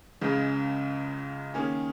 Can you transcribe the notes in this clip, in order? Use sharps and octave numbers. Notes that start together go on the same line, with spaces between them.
C#2 C#3 G#3
D#3 A#3 C#4 G#4